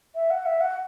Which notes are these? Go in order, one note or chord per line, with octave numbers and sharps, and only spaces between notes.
E5
F#5
E5
F#5